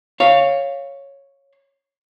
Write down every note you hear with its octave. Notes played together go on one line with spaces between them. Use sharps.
C#5 F5